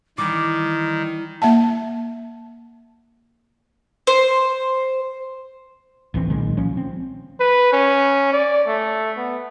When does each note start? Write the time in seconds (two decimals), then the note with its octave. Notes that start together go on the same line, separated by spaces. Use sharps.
0.18 D#3 E3 G3 D6
1.42 A#3 E5 F#5 A5
4.07 C5
6.14 D1 A1 E3 C4
6.30 B1 A#2 D#3 G#3
6.57 F3 C#4
6.77 C4
7.41 B4
7.73 C#4
8.33 D5
8.68 A3
9.17 B3